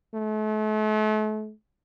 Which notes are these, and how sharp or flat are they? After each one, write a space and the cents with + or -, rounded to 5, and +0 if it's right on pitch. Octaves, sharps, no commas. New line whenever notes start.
A3 -40